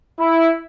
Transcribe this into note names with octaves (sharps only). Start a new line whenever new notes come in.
E4